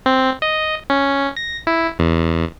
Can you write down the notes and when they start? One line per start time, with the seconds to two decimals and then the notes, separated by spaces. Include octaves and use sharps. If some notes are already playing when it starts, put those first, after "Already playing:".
0.06 C4
0.42 D#5
0.90 C#4
1.37 A#6
1.67 E4
1.99 E2